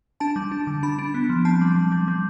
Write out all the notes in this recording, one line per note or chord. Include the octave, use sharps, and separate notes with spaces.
D4 A5
G3
D4
D3
D4 B5
D4
B3
F3
C4 A5
G3
G3
G3
G3